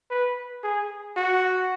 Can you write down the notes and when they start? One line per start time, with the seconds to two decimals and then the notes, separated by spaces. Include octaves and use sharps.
0.10 B4
0.64 G#4
1.17 F#4